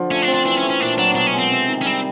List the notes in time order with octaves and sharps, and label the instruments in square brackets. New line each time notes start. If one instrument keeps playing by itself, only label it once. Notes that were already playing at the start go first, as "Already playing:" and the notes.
Already playing: [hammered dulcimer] D3 F3
[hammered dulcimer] A3 [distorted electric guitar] C#4
[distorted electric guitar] D4
[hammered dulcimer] C4
[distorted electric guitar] D4
[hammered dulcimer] E3 [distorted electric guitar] D4
[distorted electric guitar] C#4
[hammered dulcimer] A3
[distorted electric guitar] C#4
[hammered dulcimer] A#2 [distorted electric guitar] D4
[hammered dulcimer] F#3 [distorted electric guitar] D4
[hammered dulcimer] B2 [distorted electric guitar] D4
[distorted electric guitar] C#4
[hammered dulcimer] G#3 [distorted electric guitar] C4
[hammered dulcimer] C3
D#3
[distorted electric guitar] C#4
[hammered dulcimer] G3 [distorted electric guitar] C4